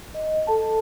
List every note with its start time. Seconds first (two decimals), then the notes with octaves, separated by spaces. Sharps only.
0.14 D#5
0.47 A4 A5